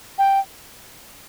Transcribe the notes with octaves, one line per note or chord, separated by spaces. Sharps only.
G5